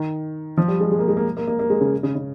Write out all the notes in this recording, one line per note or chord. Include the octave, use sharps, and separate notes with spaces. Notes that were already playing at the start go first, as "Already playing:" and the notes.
Already playing: D#3
F3
G3
G#3
G#3
A#3
G#3
A#3
A#3
A#3
A#3
G#3
C#3
C#3
C#3